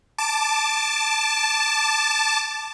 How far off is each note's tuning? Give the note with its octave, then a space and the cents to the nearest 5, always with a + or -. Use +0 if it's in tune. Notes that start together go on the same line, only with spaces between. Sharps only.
A5 +0 D6 +0